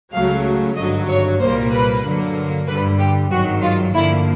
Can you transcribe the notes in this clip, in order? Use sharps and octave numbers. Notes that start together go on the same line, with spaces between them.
C#2 C#3 F#3 A3 F5
G#1 G2 D3 F#3 D#5
C#5
C2 A#2 G3 A#3 C5
B4
G2 D3 F#3 A#3
G2 D3 G3 B4
G4
G#1 G2 D#3 F#3 F#4
F4
G2 D3 F3 A#3 E4